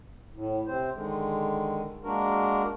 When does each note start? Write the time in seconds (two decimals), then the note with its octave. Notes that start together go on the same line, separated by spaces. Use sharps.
0.34 A2
0.67 C3 C4 C5
0.94 D3 D#3 G#3
2.04 G#3 A#3 D4 F#4 A#4